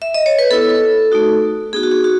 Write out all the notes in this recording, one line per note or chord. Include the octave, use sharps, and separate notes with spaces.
E5
D#5
C#5
B4
B3 E4 A4
A3 D#4 F#4
B3 D#4 F#4 G#4
F#4
G#4
F#4